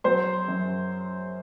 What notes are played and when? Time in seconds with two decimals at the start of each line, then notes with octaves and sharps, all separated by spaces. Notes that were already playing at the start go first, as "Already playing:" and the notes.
0.04 F#3 C5 C6
0.48 F#2